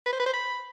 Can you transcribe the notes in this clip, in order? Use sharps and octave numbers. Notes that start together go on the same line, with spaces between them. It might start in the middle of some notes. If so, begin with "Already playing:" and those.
B4
C5
B4
C5
B5